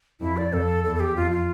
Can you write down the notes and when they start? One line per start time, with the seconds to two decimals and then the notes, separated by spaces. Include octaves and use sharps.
0.20 F2 E4
0.37 D5
0.52 F2 A4
0.84 E2 A4
0.96 A4
1.00 G4
1.16 F2 F4
1.31 F4